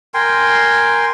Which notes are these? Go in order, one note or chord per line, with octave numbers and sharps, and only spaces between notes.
A#4 G5 G#5 C6